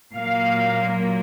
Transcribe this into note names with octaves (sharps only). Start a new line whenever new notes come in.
A#2 F#3 A#3 F5